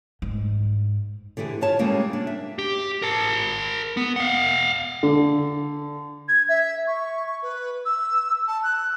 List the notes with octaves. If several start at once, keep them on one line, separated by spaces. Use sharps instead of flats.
G#2
D3 E3 G4 G#4
G2 B3 F4 C#5 A5
C#3 G3 G#3 A#3 C#4
D4
E5
G4
A#4 A5
B3
F5 F#5
D3
G#6
E5
C#6
B4
E6
A5
F#6